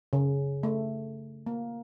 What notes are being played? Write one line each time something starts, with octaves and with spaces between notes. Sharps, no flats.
C#3
A3
A#3